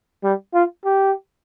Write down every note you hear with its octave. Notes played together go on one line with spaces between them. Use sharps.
G3
F4
G4